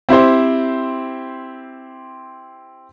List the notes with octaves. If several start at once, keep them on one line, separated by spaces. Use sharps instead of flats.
C4 E4 G4 C5